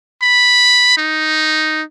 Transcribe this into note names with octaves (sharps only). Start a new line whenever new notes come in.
B5
D#4